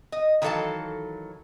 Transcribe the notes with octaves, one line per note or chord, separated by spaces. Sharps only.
D#5
D#3 E3 F#3 A4 F5 A5